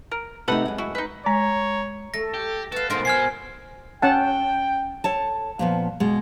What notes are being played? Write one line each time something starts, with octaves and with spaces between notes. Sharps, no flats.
A#4
C3 A3 D#4 A4 B4 F#5
F#2 G#3
E4 F#4
D#4 B4
G#3 C#5 A#5
A3 A4 A#6
G4
F#4 A4 B4 F5
G#2 B2 D#4 A#4 C5 C6
B2 G#5 F6 G#6 C7
C#4 F#5 G5 A5
A4 C#5 A5
A#2 F3 B3
B2 G#3